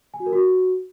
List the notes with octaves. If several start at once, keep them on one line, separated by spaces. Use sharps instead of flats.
G#5
F#4
A#4
F#4